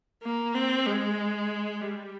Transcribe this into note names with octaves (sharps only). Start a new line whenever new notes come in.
A#3
C4
G#3
G3